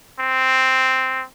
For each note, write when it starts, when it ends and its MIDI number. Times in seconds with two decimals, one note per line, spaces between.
0.20 1.24 60